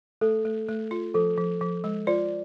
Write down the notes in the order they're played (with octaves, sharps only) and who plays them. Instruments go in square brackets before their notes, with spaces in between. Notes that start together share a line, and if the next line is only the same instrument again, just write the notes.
[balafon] A3 [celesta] A4
[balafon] A3
A3
F4
[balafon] F3 [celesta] A4
[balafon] F3
F3
G#3
[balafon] F4 [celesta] C5 D5